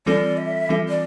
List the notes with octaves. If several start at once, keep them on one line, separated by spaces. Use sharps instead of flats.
E3 G3 C4 F4 A4 D5
E5
E3 G3 C4 F4 A4
D5